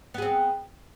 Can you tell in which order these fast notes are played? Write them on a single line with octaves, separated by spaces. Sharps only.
B3 G#4 C4